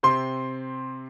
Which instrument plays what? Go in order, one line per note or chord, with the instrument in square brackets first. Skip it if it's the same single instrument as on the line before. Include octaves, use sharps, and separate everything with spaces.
[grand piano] C3 C4 C6